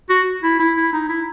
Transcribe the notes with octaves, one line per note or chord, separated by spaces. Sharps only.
F#4
E4
E4
E4
D#4
E4